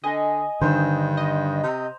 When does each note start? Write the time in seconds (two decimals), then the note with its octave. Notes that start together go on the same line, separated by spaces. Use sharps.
0.04 D3 D#5 G#5
0.61 G2 D3 D#3 C5 E6
1.17 D#5
1.63 C3 A#5